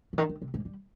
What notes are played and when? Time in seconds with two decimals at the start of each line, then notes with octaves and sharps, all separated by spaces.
0.13 C#3
0.18 D#3
0.29 D#3
0.42 C3
0.54 G#2
0.65 G3